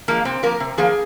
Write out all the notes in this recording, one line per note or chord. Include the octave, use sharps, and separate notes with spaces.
F3 G#3 A#3
C3 C4
F3 A#3 A#4
C3
F3 A#3 G#4